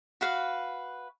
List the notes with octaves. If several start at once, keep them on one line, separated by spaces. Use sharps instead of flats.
F#4 B4 F5